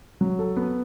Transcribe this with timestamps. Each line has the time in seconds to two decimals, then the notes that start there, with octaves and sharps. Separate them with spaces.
0.21 F#3
0.39 A4
0.57 B3